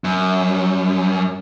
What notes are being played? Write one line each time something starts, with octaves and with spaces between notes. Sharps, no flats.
F#2